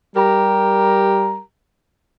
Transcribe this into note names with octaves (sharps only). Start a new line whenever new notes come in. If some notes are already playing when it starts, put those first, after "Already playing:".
G3 G4 A#4 A#5